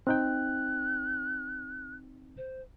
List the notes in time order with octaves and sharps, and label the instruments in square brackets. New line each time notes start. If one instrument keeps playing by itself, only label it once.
[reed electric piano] C4 D#4 G5 [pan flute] F#6
[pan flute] C5